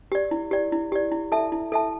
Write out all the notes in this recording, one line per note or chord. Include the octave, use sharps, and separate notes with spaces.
G4 D5
E4
G4 D5
E4
G4 D5
E4
A4 E5 A5
E4
A4 E5 A5